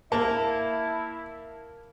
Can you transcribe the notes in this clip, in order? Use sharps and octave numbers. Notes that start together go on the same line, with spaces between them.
A#3 E4 A5